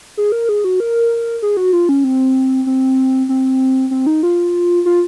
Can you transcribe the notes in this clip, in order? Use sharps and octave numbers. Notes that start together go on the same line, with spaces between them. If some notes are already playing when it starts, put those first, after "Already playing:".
G#4
A#4
G#4
F#4
A#4
G#4
F#4
F4
C#4
C4
C4
C4
C4
D#4
F4
F4